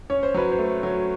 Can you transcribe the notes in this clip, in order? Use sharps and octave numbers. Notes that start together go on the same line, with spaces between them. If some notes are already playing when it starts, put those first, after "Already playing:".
C#4 C#5
C5
F#3 B4
C5
A3
F#3